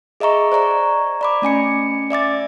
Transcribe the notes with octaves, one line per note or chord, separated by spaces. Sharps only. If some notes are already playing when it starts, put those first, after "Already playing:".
G#4 D#5 E5 A#5 C#6
C5 D5 A#5 C#6
D5 B5 D6
A3 C#4 G#5 C#7
D5 E5 D6 A6